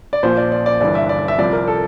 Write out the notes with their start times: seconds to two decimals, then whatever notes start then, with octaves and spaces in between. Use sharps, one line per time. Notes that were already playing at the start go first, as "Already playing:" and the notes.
0.13 D5
0.23 A#1 A#2 F3 C5
0.37 D5
0.52 D5
0.66 D5
0.80 G1 G2 E3 D5
0.95 E5
1.09 D5
1.28 E5
1.38 C2 C3 F3 D5
1.53 A#4
1.68 A4